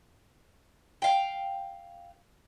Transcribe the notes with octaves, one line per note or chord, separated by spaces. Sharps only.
F5 G5